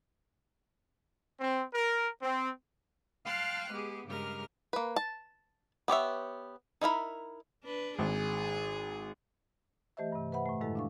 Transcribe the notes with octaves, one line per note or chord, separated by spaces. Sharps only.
C4
A#4
C4
F5 G5 A5 C6 F6 F#6
G#3 B3 G4 G#4
G2 C#3 G#3 G4 A#4 F6
A#3 B4
A5
B3 G4 C#5 E5
D#4 E4 A#4 B5
D4 B4
G#1 G#4
E3 A3 G4 C5 D#5 E5
G2 C3
B4 C5 E5 F#5 B5
A2 A3
F#2 A2 D#3 G#3 E4 A4
D4 F5 C#6